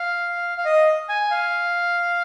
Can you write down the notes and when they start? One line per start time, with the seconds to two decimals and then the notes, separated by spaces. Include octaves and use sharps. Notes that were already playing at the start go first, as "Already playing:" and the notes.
Already playing: F5
0.58 F5
0.65 D#5
1.09 G#5
1.31 F5